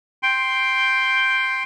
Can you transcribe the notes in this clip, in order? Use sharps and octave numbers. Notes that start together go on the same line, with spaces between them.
G5 C6